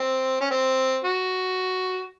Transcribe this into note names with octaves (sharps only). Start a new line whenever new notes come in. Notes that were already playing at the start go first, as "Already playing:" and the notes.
Already playing: C4
C#4
C4
F#4